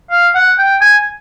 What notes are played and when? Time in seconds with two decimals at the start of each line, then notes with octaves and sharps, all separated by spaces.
0.11 F5
0.35 F#5
0.59 G5
0.81 G#5